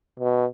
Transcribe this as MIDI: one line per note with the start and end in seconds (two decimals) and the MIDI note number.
0.20 0.46 47